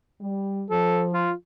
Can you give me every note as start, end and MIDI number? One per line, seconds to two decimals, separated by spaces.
0.21 0.64 55
0.70 1.29 53
0.70 1.04 69
1.13 1.33 65